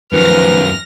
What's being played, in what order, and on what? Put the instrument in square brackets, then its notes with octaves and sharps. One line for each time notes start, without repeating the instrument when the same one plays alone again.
[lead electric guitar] F#2 D#3 [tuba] F3 [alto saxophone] B4 [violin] F6 A#6